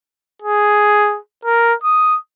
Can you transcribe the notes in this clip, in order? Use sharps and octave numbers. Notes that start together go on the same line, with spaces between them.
G#4
A#4
D#6